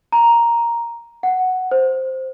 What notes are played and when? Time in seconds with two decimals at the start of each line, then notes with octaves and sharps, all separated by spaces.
0.12 A#5
1.23 F#5
1.71 C5